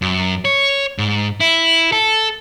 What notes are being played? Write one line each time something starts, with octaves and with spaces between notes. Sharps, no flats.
F#2
C#5
G#2
E4
A4